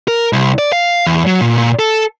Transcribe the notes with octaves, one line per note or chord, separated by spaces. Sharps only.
A#4
C2
D5
F5
E2
F#3
A#2
A#2
A4